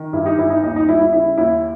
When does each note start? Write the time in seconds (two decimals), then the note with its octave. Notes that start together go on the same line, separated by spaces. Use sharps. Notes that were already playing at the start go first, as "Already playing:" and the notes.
Already playing: D#3
0.13 G2 E4
0.25 D#4 G4
0.38 G1 E4
0.50 D#4
0.63 D#2 D#4
0.76 D#4
0.89 G3 E4
1.00 E4
1.13 C#3 E4
1.38 D#2 E4